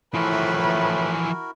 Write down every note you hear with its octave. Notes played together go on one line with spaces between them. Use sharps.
A2 E3 F3 E4 F#4 A#4 B4